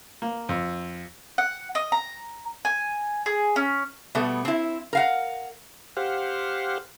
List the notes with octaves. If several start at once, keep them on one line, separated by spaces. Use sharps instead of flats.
A#3
F2
F#5
D#5
A#5
G#5
G#4
C#4
B2 G3 A3 B3
C4 E4
A#4 F5 F#5
G4 C5 F5 F#5